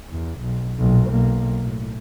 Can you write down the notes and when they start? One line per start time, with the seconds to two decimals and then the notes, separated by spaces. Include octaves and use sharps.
0.11 E2
0.41 B1
0.79 B1 A#2
1.11 B1 A#3
1.63 A2